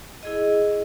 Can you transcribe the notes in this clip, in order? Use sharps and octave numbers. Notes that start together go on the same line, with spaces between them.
E4 G#4 D#5